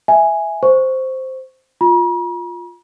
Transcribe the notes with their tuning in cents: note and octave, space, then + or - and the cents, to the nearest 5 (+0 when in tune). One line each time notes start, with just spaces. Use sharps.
E5 +0 G#5 +0
C5 +0 C#6 +0
F4 +10 A#5 +45